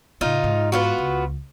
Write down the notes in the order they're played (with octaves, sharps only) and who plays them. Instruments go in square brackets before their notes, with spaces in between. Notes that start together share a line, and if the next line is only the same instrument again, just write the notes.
[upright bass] A2 C#3 [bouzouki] D#4 F4
[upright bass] G#2
[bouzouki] B3 F4 F#4
[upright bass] C#2